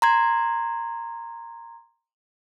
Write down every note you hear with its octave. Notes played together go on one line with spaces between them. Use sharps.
A#5 C6 G#6